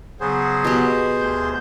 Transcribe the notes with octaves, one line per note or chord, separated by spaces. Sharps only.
C#3 F#3 B3 G#4 C5
B2 G4
D2 G6